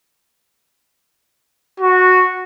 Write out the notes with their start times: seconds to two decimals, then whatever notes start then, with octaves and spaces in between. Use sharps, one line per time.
1.80 F#4